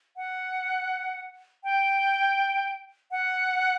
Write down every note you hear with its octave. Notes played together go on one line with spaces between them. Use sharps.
F#5
G5
F#5